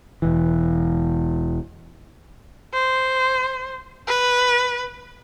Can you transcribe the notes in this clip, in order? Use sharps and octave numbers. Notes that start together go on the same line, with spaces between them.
E1 E3
C5
B4